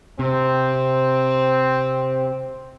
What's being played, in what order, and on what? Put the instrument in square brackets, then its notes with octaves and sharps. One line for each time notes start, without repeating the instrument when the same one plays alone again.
[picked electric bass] C3 [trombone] C4